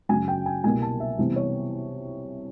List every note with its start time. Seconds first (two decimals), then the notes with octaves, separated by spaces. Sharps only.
0.09 F#2 C#3 F#3 G#5
0.28 G5
0.46 G#5
0.64 C2 B2 G3 A#3 G#5
0.82 A5
1.00 E5
1.18 C3 E3 G3 B3
1.36 C#5